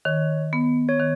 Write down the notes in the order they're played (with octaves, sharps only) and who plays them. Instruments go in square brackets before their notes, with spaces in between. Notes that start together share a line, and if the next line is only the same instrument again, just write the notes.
[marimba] D#3 [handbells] C#5
[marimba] B3
[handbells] C#5
[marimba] D#3